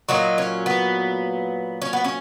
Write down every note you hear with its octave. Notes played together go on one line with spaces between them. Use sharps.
A#2 F#3 D#4
C#4
B3
C#4
B3
C#4